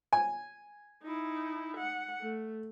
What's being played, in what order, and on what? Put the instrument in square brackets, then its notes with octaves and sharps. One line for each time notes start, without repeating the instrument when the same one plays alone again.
[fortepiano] G#5
[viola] D#4 E4
F#5
A3